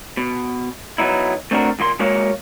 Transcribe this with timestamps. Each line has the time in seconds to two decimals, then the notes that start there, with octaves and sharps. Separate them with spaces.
0.17 B2
0.98 F#3 B3 D#4 E4
1.51 A3 C4 D4 F#4 A#4
1.79 D#2 A#2 A#3 C6
1.99 G#3 A#3 F#4 A#4 C#5 F5